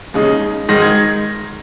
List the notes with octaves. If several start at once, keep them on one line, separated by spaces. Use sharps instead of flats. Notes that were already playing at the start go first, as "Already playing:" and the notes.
D#2 C#3 G#3 D#4
G#2 D#3 G#3 D#4 A#6
G#6